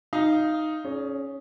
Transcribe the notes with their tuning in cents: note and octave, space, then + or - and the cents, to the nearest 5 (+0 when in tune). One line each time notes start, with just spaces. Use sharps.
D#4 +0 F5 -15
C#4 +0 G#4 +35 D5 -35